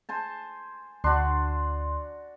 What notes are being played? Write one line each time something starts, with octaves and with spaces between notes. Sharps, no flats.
C5 G#5 A5
D2 D4 F#4 C6